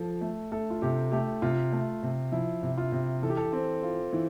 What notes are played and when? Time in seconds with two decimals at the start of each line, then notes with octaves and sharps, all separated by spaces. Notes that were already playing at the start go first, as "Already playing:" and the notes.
Already playing: F3 A4
0.21 A3
0.52 A3 A4
0.70 F4
0.82 C3 G4
1.12 A3 G4
1.42 C3 F4
1.72 A3
2.03 C3
2.32 F3 E4
2.63 C3
2.78 F4
2.92 C3
3.22 E3 A4
3.30 G4
3.37 A4
3.53 C4
3.83 F4
4.13 E3